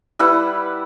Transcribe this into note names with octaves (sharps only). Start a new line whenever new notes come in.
G3 E4 B4 F#5